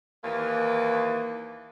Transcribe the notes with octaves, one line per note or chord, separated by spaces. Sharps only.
D#2 E3 A#3